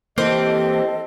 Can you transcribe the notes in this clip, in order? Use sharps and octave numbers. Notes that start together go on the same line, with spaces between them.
E3 A#3 C4 G4 A4 D#5